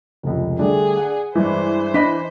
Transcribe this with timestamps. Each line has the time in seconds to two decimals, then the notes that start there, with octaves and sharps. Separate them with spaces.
0.23 F1 C#2
0.59 D3 G3 A3 D4 G#4
0.97 F#5
1.35 G2 E3 G#3 D4 C5
1.94 D4 D#5 B5 B6